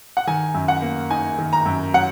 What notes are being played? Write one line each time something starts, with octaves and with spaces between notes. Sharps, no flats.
F#5
D#3 G#5
F#2
F#5
A#3
D#4 G#5
D#3
A#5
F#2
F#3 F#5